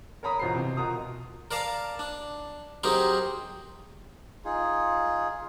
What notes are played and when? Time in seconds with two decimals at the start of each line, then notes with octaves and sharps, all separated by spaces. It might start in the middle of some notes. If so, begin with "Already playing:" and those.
0.23 A#4 C#5 A#5 B5 D#6
0.39 A1 B2 F4 C5 A#5 C7
0.55 C3
0.77 B2 F4 A#4 A#5 D#6
1.51 A#4 D5 F5 A5
1.99 D4
2.84 F#3 C4 D#4 G4 G#4 A#4
4.45 D#4 F4 G#4